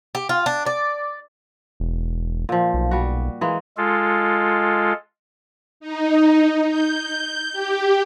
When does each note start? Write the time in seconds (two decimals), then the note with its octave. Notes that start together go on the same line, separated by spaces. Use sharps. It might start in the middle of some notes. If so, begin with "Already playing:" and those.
0.15 G4
0.29 F4
0.46 D4
0.66 D5
1.80 E1
2.49 A#2 F3
2.74 B1
2.91 G3 F#4
3.41 E3 G#3 A#3
3.77 G#3 F4 A4
5.80 D#4
6.68 G6
7.52 G4